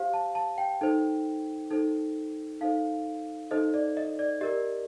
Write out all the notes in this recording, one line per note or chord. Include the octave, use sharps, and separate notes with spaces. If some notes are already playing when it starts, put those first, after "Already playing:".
Already playing: G4 C5 F5
A5
A5
G5
D#4 A4 C5
D#4 A4 C5
D#4 A4 C5 F5
D#4 A4 C5 D#5
D5
D#5
D5
G4 A#4 D5 D#5